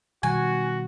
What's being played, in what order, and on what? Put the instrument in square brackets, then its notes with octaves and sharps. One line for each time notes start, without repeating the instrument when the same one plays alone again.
[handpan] B2 D#3 G3 [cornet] F#4 [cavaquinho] G#5